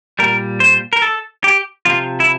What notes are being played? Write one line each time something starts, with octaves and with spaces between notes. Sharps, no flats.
A#2 G3 A#4
C5
A#4
A4
G4
C3 F3 F4
E4